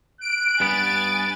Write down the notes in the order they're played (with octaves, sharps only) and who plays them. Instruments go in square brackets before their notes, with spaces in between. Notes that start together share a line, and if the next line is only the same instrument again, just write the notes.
[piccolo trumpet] F#6 [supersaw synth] D7
[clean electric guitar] G2 B3 [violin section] G#5 A6